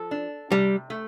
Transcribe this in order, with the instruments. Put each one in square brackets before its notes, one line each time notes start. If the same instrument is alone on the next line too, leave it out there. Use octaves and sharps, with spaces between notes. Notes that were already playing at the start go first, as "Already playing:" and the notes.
Already playing: [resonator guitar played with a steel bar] F3 A4
D4
[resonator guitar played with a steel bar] C3 [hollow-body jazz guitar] G3
[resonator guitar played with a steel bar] A3